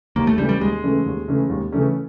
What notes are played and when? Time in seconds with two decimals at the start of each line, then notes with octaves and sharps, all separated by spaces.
0.16 D#2 A#3
0.27 A3
0.38 C#3 E3 G3 A3 C#4
0.49 G3
0.61 D#2 G#3
0.83 C#3 E3 A3 C#4
1.06 D#2
1.28 C#3 E3 A3 C#4
1.49 D#2
1.72 C#3 E3 A3 C#4